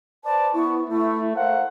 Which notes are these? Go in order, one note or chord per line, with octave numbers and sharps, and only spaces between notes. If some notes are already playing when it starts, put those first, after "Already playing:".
B4 C5 D5 A5
B3 E4 C#6
A3 E4
A#4 C5 F5 F#5